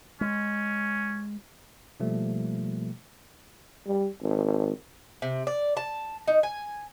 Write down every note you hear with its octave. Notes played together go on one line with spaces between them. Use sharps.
G#3 C#4
B2 F3 G3 A3 A#3
G3
G#1
C3
D5
A5
D#4
G#5